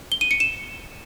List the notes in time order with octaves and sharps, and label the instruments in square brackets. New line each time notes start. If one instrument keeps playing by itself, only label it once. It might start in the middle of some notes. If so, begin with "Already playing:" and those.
[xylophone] G7
D#7
C#7
E7